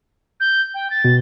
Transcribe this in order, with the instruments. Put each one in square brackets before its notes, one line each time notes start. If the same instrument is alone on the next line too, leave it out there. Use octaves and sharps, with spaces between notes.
[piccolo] G6
G5
A6
[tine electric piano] B2